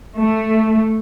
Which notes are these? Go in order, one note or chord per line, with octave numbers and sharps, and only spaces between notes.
A3